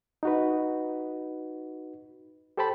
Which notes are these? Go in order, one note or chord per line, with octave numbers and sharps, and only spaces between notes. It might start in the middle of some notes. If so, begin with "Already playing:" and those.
D#4 F#4 B4
G4 A4 C5 G5 A5 B5